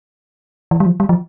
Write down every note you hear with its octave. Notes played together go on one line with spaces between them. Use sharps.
E3
G3
F3
G3
F3